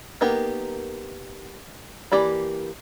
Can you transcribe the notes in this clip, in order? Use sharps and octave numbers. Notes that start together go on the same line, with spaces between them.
A#3 B3 D#4 G4 A#4
E3 A#3 G4 D5 B5